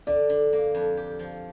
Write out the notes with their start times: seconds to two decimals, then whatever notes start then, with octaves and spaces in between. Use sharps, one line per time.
0.07 D3 D5
0.30 D3
0.53 A#3
0.75 F2
0.97 G4
1.19 F3